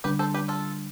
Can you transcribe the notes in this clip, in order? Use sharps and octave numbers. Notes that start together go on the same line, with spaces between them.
D3 G3 D4 G4 B4
A4 C5
G4 B4
F4 A4